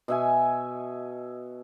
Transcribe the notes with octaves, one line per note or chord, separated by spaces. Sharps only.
B2 E5 G#5